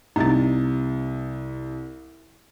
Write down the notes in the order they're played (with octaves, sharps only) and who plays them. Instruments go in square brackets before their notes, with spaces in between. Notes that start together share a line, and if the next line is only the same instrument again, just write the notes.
[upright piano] C2 [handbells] D#4 A6